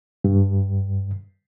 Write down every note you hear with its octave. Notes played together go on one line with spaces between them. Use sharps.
G2